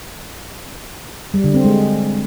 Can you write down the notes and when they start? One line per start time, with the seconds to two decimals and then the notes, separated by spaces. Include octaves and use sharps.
1.34 G3
1.44 D3
1.54 C4
1.65 G#3